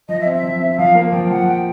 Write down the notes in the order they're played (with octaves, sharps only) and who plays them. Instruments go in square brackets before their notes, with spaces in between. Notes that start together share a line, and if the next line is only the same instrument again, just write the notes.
[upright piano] F3 [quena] D#5
[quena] E5
[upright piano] C4
[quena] E5
[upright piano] F3
C4
[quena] E5
[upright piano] F3 [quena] F5
[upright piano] A#3
[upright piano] F3 [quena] G5
[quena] G5
[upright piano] F3 [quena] F#5
[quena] G5